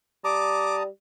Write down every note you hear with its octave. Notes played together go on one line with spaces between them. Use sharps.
G3 A5 A#5 D6 D#6